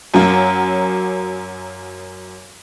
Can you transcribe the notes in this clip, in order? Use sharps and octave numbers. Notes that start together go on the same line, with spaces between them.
F#2 F#3 A#3